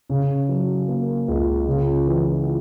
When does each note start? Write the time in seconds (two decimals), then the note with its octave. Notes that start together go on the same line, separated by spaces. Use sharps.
0.09 C#3
0.49 F#3
0.88 A#3
1.28 C#2
1.67 C#3
2.06 E3